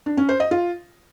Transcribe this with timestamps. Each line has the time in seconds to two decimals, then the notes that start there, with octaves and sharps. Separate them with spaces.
0.06 D4
0.17 C#4
0.29 C5
0.40 D#5
0.51 F4